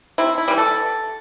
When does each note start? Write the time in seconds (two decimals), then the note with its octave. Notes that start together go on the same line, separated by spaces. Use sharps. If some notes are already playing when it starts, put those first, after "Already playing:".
0.18 C3 E4
0.38 E4
0.48 E3 G3
0.58 A4